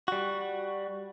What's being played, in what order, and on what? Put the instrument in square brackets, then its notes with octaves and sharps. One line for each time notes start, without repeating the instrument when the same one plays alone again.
[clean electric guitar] G3 F#4